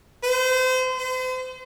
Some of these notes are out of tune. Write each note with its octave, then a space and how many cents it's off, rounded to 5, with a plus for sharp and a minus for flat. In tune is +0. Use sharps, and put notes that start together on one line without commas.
C5 -30
C5 -40